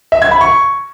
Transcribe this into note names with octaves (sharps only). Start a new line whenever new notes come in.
E5
G#6
B5
C#6